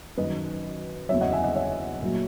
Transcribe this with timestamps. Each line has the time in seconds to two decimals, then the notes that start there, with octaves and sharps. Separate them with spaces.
0.17 F#2 D#3 F#3 B4 D#5
1.09 E2 C#3 F#3 C#5 E5
1.21 D#5 F#5
1.32 E5 G#5
1.43 D#5 F#5
1.55 C#5 E5
2.02 A#2 F#3